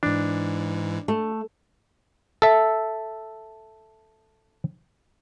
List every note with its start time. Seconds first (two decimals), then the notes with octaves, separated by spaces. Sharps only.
0.03 G#2 E3 D4
1.08 A3
2.42 A4 E5